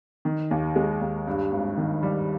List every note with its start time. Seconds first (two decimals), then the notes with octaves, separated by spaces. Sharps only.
0.25 D#3
0.51 D#2
0.76 G#3
1.01 D#2
1.27 G2
1.52 G#1
1.77 D#3
2.03 G3